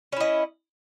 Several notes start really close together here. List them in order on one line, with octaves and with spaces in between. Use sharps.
C#4 E4 D#5